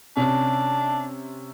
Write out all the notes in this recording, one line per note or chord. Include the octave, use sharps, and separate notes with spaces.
C3 C#4 D4